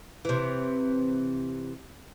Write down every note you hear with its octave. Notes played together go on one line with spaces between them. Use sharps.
C3 E3